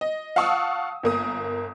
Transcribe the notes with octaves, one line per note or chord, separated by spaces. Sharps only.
D#5
F5 F#5 A5 C#6 D#6 E6
G1 A#3 D#6